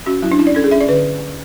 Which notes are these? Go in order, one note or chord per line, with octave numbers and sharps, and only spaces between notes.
C#4 F#4
F#3 E4
D4
C#4 E4
D5
C#4 A4
G#4
C#4 E5
D5
D3 B4